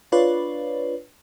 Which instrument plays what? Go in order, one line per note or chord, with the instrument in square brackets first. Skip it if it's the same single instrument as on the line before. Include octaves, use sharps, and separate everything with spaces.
[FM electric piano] D4 F4 B4 C#5 D5